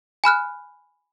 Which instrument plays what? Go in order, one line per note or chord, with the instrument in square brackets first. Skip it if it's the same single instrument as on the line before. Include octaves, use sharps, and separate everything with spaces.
[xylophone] G#5 B5 F6 F#6